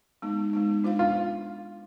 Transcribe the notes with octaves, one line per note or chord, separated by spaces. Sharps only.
G#3 B3 D#4
G#3 B3 D#4
D4 F4 C5 F5
F4